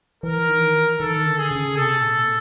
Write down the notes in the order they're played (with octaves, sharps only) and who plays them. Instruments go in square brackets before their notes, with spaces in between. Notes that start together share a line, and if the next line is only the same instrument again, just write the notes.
[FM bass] E3 [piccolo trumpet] A#4
[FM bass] D#3
E3
[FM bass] D#3 [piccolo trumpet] A4
[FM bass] D3
[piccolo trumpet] G#4
[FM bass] C#3
[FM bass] C3 [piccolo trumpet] A4
[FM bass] A#2